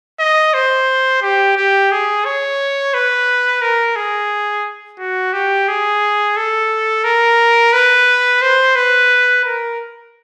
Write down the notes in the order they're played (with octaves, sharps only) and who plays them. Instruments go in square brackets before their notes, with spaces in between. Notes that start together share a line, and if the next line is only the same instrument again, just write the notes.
[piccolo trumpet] D#5
C5
G4
G4
G#4
C#5
B4
A#4
G#4
F#4
G4
G#4
A4
A#4
B4
C5
B4
A#4